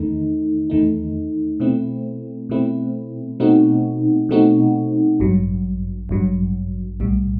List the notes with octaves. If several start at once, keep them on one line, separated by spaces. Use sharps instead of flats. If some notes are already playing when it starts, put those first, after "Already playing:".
Already playing: E2 D#3 A3 D#4
E2 D#3 A3 D#4
B2 A3 C4 E4
B2 A3 C4 E4
B2 A3 C4 D#4 F#4
B2 A3 C4 D#4 F#4
A1 G2 F#3
A1 G2 F#3
B1 A2 G3